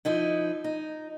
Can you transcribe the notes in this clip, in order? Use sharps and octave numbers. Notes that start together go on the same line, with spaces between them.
F3 D#4 E4
D#4